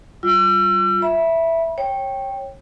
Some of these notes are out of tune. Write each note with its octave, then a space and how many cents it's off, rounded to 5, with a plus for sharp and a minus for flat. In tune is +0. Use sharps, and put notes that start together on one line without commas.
G3 -30 F4 +0 E6 +40
E5 +0 B5 -30
C#5 -20 G5 +0